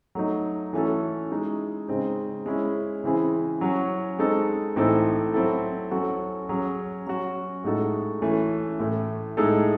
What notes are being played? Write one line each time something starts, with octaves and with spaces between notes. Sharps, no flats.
F#3 A3 D#4
E3 A3 C#4 F#4 A4
G#3 D#4 G#4
C#3 G#3 C4 D#4
G#3 C#4 E4
C#3 E3 C4 E4 G#4
F#3 C#4 F#4
G#3 C4 D#4 A4
A2 E3 C4 D#4 A4
F#3 C4 E4 A4
F#3 C#4 F#4 A4
F#3 C#4 G#4
F#3 C#4 F#4
A2 G#3 D#4 F#4 A4
E3 A3 C#4
A2 E3 A3
A2 G#3 D#4 A4